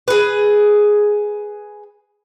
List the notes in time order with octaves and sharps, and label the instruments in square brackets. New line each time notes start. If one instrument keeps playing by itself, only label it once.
[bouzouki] G#4 B4